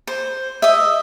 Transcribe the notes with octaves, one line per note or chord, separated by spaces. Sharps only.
C5
D#5 E5